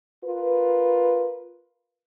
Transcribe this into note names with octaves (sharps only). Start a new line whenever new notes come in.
F4 A#4 B4